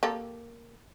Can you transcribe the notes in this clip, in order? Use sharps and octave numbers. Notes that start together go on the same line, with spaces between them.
A#3 G4 A4